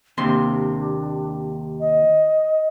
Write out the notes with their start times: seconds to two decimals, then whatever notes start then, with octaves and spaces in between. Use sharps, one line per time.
0.18 D#2 C3 D4 C6
1.80 D#5